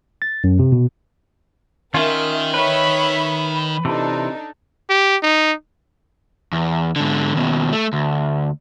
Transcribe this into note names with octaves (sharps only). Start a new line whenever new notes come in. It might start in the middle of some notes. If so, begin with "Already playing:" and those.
A6
F#2
C3
B2
D#3 C#4 F4 A#4 E5
B4 C#5 E5 B5
C3 E3 D4 D#4 A4
G4
D#4
E2
G#2 D3
D#2 B2
A3
D2